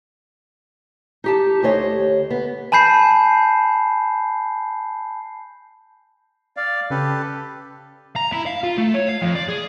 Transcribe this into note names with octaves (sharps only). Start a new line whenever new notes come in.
D#4 G4 A5
D2 G4 C5 C#5 D#5
B3
G#5 A5 B5 G6 C7
D5 F5
C#3 C#4 G4 A4 B4
A#5
E4
F5
F4
A3
C#5
F5
F2
D5
G#4